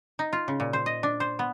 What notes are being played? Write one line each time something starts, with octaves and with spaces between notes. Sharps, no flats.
D#4
F4
C#3
A#2
C5
D#5
D4
C5
B3